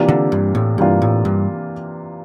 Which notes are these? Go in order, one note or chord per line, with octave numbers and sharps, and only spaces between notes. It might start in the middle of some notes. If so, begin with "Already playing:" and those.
Already playing: C3 E3 A#3 D4 F4
D3
G2
A2
G2 C3 E3 A#3 D4 F4
A2
G2